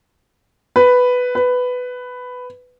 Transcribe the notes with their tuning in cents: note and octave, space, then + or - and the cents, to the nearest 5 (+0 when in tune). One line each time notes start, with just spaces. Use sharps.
B4 +5
B4 +10